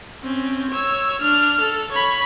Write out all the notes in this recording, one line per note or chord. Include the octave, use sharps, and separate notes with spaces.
C4 C#4
C#5 E6
D4 F6
A4
C#5 B5